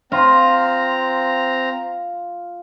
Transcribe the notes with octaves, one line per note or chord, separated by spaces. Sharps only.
C4 F4 A#5